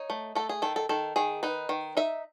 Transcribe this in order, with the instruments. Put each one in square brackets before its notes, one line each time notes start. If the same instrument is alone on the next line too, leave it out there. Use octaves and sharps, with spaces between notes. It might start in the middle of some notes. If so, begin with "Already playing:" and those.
Already playing: [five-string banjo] D#4 C#5
A3
A3 A4
G#4
D#3 A4
A4
D#3 A4
D#3 G#4
D#4 B4
D#3
D#4 E5